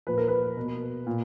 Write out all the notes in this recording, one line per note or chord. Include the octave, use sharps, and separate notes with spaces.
A#2 F3 B4
A#4
B4
B2
A#2